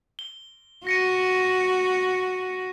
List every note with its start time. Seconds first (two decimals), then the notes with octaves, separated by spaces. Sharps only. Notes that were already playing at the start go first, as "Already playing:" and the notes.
0.19 G7
0.87 F#4 A#6 C#7 D#7